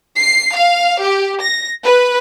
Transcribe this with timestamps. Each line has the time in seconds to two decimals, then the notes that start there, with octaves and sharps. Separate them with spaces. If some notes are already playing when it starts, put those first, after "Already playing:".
0.18 C7
0.55 F5
1.02 G4
1.41 A#6
1.83 B4